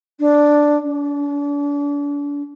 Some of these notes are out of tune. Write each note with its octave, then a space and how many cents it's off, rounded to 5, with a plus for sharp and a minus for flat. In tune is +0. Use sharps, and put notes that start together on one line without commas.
D4 +0
D4 -40